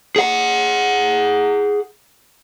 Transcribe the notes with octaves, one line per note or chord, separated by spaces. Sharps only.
G#4 F#5